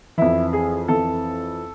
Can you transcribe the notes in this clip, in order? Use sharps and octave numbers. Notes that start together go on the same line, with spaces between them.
F2 E3 E4
G#4
F2 E3 A4